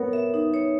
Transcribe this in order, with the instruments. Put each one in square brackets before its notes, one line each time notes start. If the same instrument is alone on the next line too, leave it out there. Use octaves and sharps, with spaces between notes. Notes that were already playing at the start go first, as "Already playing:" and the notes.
Already playing: [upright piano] B3 [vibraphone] A#4 C#5
[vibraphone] E5
D#4
C#5